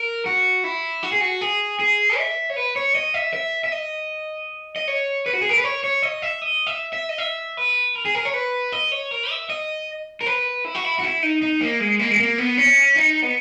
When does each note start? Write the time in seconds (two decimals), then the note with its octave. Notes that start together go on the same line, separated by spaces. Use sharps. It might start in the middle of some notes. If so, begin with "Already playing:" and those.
Already playing: A#4
0.26 F#4
0.64 E4
1.03 F#4
1.12 G#4
1.21 F#4
1.41 G#4
1.79 G#4
2.18 E5
2.50 C#5
2.56 B4
2.76 C#5
2.95 D#5
3.14 E5
3.33 E5
3.64 E5
3.72 D#5
4.76 D#5
4.88 C#5
5.26 B4
5.33 F#4
5.42 G#4
5.49 A#4
5.57 B4
5.64 C#5
5.84 C#5
6.03 D#5
6.22 E5
6.42 D#5
6.67 E5
6.93 E5
7.09 D#5
7.18 E5
7.57 B4
7.95 A#4
8.05 G#4
8.15 A#4
8.25 C#5
8.34 B4
8.72 D#5
8.92 C#5
9.11 A#4
9.30 E5
9.50 D#5
10.21 A#4
10.26 B4
10.65 E4
10.75 F#4
10.85 E4
10.99 F#4
11.03 E4
11.23 D#4
11.42 D#4
11.61 A#3
11.80 G#3
11.99 A#3
12.10 G#3
12.18 A#3
12.38 B3
12.57 C#4
12.96 D#4
13.22 B3